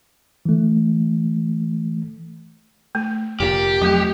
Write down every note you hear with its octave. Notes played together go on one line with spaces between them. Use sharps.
E3 A3
A3
F1 A#2 G4
F2 F#3 A3